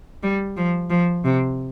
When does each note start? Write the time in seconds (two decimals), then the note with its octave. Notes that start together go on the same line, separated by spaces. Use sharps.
0.23 G3
0.57 F3
0.90 F3
1.25 C3